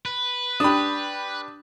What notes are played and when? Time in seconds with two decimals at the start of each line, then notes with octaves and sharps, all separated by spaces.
0.06 B4
0.60 D4 G4 B5 D#6